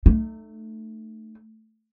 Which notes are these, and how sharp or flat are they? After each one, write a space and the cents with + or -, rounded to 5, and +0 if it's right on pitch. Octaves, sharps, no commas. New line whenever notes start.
A3 +0 D#4 -35